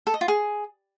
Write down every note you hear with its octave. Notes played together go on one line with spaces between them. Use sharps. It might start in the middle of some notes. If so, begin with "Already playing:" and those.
A4
D#5
F4
G#4